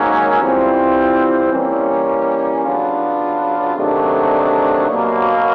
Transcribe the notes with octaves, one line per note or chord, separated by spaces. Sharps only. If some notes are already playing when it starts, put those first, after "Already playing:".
Already playing: G#2 D#3 F#3 A#3 C#4
E3 G3 C4 F4
E3 G3 A#3 C#4
C#3 F#3 B3 D4 F4
C3 D#3 F#3 A3 D4
B2 F#3 A#3